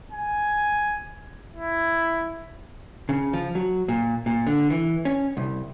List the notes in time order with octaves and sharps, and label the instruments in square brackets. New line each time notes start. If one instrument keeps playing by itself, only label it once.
[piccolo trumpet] G#5
E4
[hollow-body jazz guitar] C#3
F3
F#3
A#2
A#2
D3
E3
C#4
C2